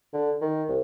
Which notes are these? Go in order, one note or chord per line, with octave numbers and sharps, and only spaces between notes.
D3
D#3
C2